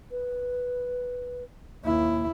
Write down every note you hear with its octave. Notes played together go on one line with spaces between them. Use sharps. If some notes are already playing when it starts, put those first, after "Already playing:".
B4
D#2 A#3 E4